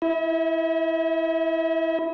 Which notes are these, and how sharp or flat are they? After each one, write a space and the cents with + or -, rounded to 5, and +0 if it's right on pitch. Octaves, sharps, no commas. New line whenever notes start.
E4 +0 E5 -45